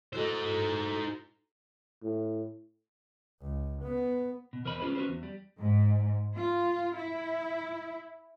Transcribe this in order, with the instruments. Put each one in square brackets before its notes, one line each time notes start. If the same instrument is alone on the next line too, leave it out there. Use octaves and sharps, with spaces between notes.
[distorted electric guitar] D#4 C5 [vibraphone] E4 F#4 A4
[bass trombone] A2
[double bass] C#2
B3
[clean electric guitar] B2
E2 A#4 C5 D#5 B5
C#4 F4 G#4 B4 C5
C#4 F#4 B4 C5
E2
G3
[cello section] G#2
F4
E4